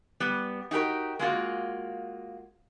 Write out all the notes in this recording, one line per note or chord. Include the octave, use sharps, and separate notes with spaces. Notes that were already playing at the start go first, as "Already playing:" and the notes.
G3 B3
D#4 F#4 G4 A#4
G#3 A#3 F4 F#4